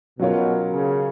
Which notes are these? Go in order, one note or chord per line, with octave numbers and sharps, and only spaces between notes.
B2 F#3 C#4 F4 A#4 C#5
C#3